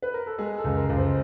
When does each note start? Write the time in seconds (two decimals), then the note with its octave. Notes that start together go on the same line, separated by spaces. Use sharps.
0.02 B4
0.14 A#4
0.26 A4
0.38 G#3 G#4
0.58 A4
0.64 C#2
0.77 A#4
0.89 C#2
0.97 C5